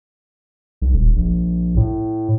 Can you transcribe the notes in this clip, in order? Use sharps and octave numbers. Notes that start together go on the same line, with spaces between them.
B1
D#1
A#1
A2